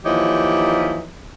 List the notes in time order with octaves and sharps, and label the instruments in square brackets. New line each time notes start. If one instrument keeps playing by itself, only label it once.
[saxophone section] D#2 E3 F3 D#4 G4 C#5